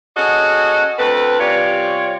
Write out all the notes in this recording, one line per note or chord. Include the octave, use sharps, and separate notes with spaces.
C#4 F#4 G#4 A4 D#5
D2 C4 A4 B4
C3 G3 C#4 F4 C#5 D5